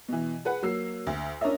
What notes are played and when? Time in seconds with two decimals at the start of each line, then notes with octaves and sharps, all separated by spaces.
0.08 B2 E3
0.45 G#4 B4 F#5
0.62 F#3 A#3 E6 C7
1.07 D2
1.41 C#4 D4 A#4 C#5 D#5 E5